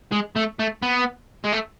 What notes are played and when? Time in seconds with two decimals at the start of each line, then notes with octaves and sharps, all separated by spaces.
0.12 G#3
0.36 A3
0.60 A3
0.82 B3
1.44 G#3
1.52 A3